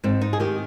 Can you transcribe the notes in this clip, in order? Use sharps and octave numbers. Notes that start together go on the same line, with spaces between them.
G#2 C4
D#4
G#4
D#3 G4